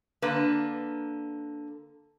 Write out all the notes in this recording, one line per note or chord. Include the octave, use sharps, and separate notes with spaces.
D3 A#3 B4